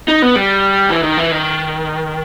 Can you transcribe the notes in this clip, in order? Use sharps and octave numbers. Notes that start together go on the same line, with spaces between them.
D#4
B3
G3
E3
D#3
E3
D#3